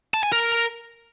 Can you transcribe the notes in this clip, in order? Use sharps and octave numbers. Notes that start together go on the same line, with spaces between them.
A5
G#5
A#4